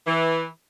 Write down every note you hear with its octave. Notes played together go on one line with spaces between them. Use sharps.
E3